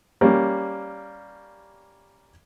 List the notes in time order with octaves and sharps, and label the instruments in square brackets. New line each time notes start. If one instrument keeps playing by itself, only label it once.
[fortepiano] G3 A#3 C#4